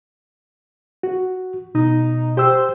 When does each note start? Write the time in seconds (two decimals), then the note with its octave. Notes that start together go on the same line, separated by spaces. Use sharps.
1.03 F#4
1.75 B2 D#4
2.37 G4 C5 G5 E6